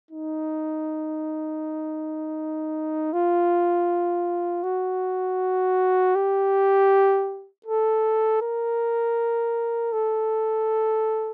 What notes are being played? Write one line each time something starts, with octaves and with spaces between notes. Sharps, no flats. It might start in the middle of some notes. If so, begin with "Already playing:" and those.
D#4
F4
F#4
G4
A4
A#4
A4